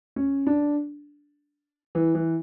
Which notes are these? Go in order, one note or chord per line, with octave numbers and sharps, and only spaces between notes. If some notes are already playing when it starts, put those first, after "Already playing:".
C#4
D4
E3
E3